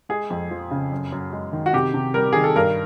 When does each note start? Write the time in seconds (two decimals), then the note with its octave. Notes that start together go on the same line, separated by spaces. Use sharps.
0.09 G#3 G#4
0.30 F2
0.51 F3
0.71 C#3
0.92 F#2
1.12 F#2
1.33 G#3
1.53 D#3
1.66 F#4
1.73 C3 G4
1.94 C3
2.14 G3 A#4
2.33 D#3 G#4
2.44 A4
2.56 G2 A#4